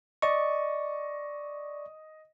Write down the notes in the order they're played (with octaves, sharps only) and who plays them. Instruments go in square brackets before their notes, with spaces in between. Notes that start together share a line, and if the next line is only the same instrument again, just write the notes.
[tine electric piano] D5 C#6 [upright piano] D#5